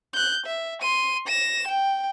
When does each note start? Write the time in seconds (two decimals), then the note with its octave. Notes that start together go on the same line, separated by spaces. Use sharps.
0.13 F#6 G6
0.46 E5
0.81 C6 D#7
1.27 A#6 E7
1.67 G5